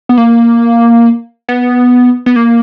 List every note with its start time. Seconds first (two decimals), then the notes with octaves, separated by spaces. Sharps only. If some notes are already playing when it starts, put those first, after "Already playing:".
0.09 B3
0.17 A#3
1.49 B3
2.26 B3
2.36 A#3